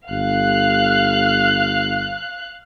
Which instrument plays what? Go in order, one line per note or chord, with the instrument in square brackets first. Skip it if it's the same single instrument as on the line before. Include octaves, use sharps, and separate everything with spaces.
[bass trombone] G1 [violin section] F5 F#6